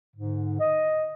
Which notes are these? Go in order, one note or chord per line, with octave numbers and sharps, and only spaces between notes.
G#2 D3
D#5